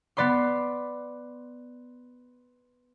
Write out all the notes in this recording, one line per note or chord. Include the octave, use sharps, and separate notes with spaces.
B3 B4 D5 B5 C6